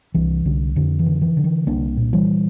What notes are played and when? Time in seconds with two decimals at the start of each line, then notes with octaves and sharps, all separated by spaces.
0.14 C2 E3
0.45 C2 D3
0.76 F2 D3
0.99 E3
1.06 D3
1.21 E3
1.37 D3
1.44 E3
1.67 C2 A#3 D4
1.97 A#2
2.13 E3 G3